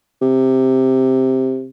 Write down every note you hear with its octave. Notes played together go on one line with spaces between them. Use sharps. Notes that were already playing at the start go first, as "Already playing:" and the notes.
C3